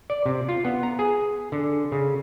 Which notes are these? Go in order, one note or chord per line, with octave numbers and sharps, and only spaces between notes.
D5
C3
F4
B3
A#5
G#4
D3
C#3